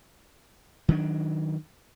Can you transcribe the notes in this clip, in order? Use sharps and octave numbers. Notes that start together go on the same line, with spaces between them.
D#3 F#3 D4